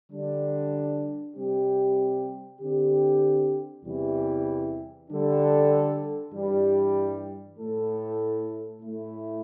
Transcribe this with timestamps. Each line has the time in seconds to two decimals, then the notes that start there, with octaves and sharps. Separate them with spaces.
0.11 D3 G3 D4
1.35 C3 G3 C4 G4
2.60 D3 C4 G4
3.84 E2 C3 E3 G3 E4
5.09 D3 G3 D4 A4
6.33 G2 E3 G3
7.58 A2 A3 E4 A4
8.82 A2 A3 E4